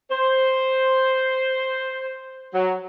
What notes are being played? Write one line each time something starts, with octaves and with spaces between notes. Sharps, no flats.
C5
F#3